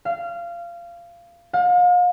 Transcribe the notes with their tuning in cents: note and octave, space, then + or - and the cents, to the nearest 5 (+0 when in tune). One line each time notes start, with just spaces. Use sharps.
F5 -20
F5 +40